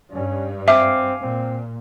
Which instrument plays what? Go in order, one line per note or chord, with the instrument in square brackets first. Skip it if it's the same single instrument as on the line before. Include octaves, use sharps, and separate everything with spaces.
[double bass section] G2 [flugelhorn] C#4
[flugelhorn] C4 [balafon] E5 [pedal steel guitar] F5 G#5 D6
[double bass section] A#2 [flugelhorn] C4